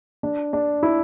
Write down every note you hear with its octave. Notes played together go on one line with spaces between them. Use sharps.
D4
D4
E4